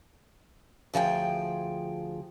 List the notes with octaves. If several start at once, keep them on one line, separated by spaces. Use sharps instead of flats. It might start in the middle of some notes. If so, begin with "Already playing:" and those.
D2 F3 G#4 G5